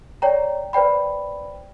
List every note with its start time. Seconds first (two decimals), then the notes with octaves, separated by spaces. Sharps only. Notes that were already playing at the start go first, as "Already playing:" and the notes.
0.22 C#5 D5 G5 A#5
0.73 B4 C5 D5 G5 B5